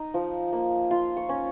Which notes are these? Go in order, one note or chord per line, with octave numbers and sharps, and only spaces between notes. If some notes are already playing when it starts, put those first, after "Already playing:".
Already playing: D#4
F3
A#3
F4 C6
C#6
C#4